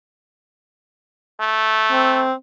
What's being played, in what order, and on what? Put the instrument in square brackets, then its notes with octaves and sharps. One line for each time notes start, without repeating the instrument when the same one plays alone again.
[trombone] A3
[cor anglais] C4